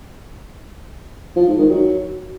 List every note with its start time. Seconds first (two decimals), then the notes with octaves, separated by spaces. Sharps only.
1.36 F3
1.47 G#2
1.59 D#3
1.70 F#3